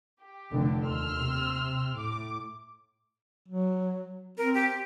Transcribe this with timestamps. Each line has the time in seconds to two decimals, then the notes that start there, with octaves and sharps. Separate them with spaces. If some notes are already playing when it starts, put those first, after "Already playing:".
0.22 G4
0.52 F1 D3
0.86 D#2 C6 E6 F6
1.18 C3
1.97 A2 D6
3.48 F#3
4.38 C4 A#4
4.54 G4